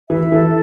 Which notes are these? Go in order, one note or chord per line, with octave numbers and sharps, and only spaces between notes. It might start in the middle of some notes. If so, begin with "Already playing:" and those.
E3 E5
E3 A4